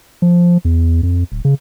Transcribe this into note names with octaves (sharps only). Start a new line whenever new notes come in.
F3
E2
F2
D1
C#3